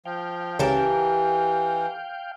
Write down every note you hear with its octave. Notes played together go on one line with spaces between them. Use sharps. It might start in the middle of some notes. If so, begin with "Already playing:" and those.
F3 F5 G5
C#2 C#3 E3 G4 A#4 A5 D7